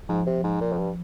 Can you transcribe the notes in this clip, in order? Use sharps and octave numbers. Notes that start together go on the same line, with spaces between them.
G#2 F3
C3
G#2
A#2
F2
G2